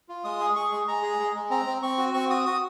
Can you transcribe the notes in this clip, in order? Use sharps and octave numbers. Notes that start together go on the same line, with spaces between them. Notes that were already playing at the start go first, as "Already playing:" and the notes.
F4
G#3 D#6
G#4
G#4 C#6
G#3
G#3 A#5
G#4
G#3
G#3
C4 A#5
C4
C4 C#6
F#4
C4 C#6
F#4 D#6
F#4 D#6